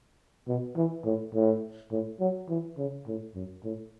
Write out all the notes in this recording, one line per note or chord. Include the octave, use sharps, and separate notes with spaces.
B2
E3
A2
A2
A2
F#3
E3
C#3
A2
F#2
A2